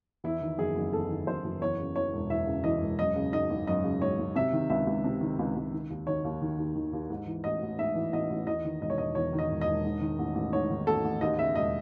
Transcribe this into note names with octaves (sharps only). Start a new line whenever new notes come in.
E2 E4
D#3
F#1 G#4
F#1
E2 A4
D#3
F#1 C5
F#1
E2 C#5
C#3
E3 C#5
E1
E2 E5
C#3
E3 D#5
E1
F#2 D#5
C#3
G#1 D#5
G#1
F#2 D#5
C#3
G#1 C#5
G#1
C3 E5
D#3
C#2 E5
C#2
C3
D#3
C#2
C#2
D#3
D#2
D#3 C#5
D#2
D#3
D#2
D#3
D#2
G#2
E3
A1 D#5
A1
G#2 E5
E3
A1 D#5
A1
E2 D#5
D#3
E1 D#5
C#5
E1 D#5
E2 C#5
D#3
D#5
E1
D#5
E1
G#2
D#3
A1
A1
G#2 C#5
D#3
A1 A4
A1
D#2 D#5
C#3 E5
E1 D#5